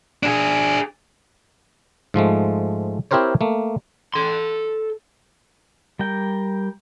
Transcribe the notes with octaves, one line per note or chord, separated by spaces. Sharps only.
D4 G#4
G#2 F3 G#3 A3
C4 E4 G4 A#4 C5 C#5
A3 A#3
A4 C6
G3 A#4 G5